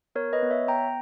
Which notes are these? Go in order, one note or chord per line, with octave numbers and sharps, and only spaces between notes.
B3 A#4 C#5
B4 D#5
B3
C#5 E5
B3 G5 A#5